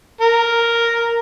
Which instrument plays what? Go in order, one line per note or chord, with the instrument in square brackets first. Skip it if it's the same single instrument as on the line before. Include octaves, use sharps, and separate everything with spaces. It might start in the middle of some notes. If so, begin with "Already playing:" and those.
[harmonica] A#4